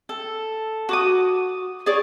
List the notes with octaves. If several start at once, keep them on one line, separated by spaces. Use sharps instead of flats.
A4
F#4 D6 D#6
G#4 C#5 D5